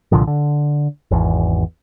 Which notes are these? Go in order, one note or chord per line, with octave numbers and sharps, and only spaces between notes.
C2 A#2 D3 F3
D3
G#1 E2